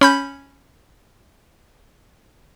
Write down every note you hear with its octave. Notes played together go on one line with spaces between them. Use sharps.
C#4 B5 G6